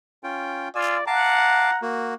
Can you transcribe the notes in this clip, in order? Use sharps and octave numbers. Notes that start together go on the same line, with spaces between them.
C#4 F4 G5
F4 D5 G#5 E6
F5 F#5 A5 A#5 D6
A#3 F#4